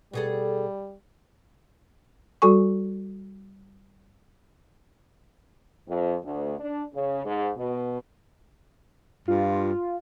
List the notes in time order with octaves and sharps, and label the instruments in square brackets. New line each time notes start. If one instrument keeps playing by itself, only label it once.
[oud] B2 G#4 A4 [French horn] G3
[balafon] G3 F#4 A4 G#5 C#6
[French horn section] F2
D2
D4
C#3
G#2
B2
[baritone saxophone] G2 [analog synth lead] F4